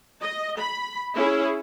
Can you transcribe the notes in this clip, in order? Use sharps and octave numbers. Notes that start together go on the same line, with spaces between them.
D#5
B5
C#4 E4 G#4